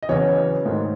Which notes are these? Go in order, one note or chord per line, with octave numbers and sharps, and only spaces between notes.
D#5
E2 C#3 F#3 B3 C#5
G#2 D#3 A3